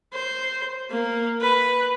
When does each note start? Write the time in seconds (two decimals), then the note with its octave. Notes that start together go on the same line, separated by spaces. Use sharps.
0.14 C5
0.90 A#3
1.41 B4